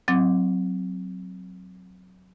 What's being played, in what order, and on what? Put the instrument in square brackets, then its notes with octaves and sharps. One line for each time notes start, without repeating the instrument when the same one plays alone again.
[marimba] F#3 C4 D6